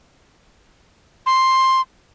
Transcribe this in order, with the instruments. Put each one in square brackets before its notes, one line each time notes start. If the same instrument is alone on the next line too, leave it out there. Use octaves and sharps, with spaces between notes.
[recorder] C6